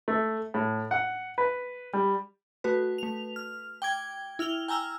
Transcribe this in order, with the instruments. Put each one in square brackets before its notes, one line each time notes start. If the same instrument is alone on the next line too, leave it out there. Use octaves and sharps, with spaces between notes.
[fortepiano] A3
A2
F#5
B4
G3
[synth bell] A3 F#4 B4
A3 F7
F6
G5 D6 G#6
E4 F6 F7 G7
G5 G#5 A#5 E6 F6